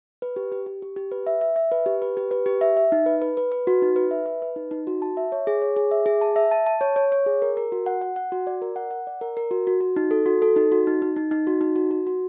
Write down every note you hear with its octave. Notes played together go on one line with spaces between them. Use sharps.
B4
G4
G4
G4
G4
G4
B4
E5
E5
E5
B4
G4
B4
G4
B4
G4
E5
E5
D#4
B4
B4
B4
B4
F#4
D#4
B4
E5
B4
B4
D#4
D#4
F#4
A5
E5
C#5
G#4
C#5
G#4
E5
G#4
A5
E5
A5
A5
C#5
C#5
C#5
G#4
A#4
A#4
F#4
F#5
F#5
F#5
F#4
D5
A#4
F#5
F#5
D5
A#4
A#4
F#4
F#4
F#4
D#4
A4
F#4
A4
D#4
F#4
D#4
D#4
D#4
D#4
F#4
D#4
F#4
F#4
F#4